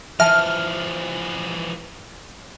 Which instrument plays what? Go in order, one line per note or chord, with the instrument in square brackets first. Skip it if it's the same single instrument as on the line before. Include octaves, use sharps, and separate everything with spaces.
[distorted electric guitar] E3 F3 [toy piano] E5 A5 [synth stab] F6